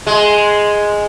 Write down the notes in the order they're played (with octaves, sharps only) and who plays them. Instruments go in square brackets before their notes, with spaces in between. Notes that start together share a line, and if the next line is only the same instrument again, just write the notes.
[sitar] G#3